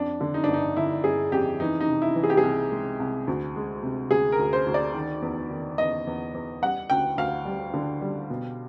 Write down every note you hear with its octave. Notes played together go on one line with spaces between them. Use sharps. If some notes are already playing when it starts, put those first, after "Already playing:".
Already playing: F2 D4
D3
D#4
G1 D4
D#4
D3 E4
G1 G#4
F2 G4
E3 D#4
D#4
C3
E4
E3
G#4
G4
G#4
C2
G#3
C2
D2
G#3
C3
D2 G#4
A#4
D2
C5
D2
D5
D#3
E2
D#3
E2 D#5
E2
E2
G3 F#5
D2 G5
D2 F5
G3
D3
G3
B2